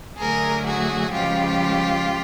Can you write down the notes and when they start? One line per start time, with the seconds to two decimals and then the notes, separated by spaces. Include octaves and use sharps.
0.18 D3 F#3 A3 G#4 A#4
0.65 F#4 G#4
1.13 C#3 F3 G#3 F4 G4